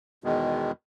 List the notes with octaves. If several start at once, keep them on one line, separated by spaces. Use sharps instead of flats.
E2 B2 D#3 G#3